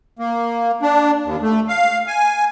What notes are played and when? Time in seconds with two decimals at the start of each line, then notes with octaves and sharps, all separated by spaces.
0.19 A#3
0.82 D4
1.25 D#2
1.42 A3
1.68 F5
2.07 G#5